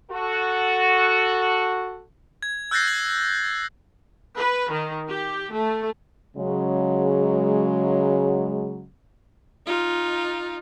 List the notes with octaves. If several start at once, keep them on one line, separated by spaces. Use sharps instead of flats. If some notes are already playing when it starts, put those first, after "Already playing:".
F#4 A4
G#6
E6 F#6 G6 A6 A#6 C7
F#7
B4
D#3
G4
A3
C#3 F#3 G#3
D#4 F4